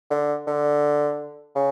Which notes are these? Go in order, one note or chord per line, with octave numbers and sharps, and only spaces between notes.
D3
D3
C#3